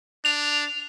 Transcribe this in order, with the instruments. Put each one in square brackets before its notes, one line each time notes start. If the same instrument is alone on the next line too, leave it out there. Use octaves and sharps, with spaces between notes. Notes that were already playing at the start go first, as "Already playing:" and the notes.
[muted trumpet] D4 [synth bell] F7